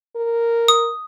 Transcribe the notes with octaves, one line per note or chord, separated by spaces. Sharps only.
A#4
D#6